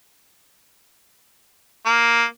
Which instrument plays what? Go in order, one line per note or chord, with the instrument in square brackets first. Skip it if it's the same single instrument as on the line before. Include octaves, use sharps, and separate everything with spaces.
[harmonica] A#3